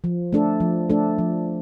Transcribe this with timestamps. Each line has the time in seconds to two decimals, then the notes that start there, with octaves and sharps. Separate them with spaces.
0.04 F3
0.33 A3 D4 A4
0.60 F3
0.90 A3 D4 A4
1.18 F3